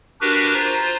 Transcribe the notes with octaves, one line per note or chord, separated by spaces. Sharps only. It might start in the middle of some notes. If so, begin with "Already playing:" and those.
D4 F#4 G4 A#4 B4
F4 C5 A#5